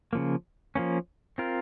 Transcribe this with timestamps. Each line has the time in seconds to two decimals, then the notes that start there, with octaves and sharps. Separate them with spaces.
0.13 C#3 F3 A#3
0.75 F3 A#3 C#4
1.38 C4 F4 A#4